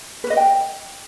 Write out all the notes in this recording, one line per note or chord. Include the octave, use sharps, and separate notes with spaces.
B4
D#5
G5